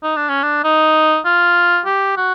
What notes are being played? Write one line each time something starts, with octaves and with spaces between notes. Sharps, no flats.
D#4
D4
C#4
D4
D#4
F4
G4
F#4